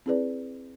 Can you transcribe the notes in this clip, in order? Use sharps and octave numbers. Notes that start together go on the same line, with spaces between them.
C4 E4 G#4 B4 D5